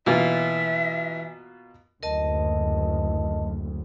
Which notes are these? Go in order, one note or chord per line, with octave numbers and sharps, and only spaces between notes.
B2 E3 A#3 F4 E5
F#1 D2 A#4 D#5 A5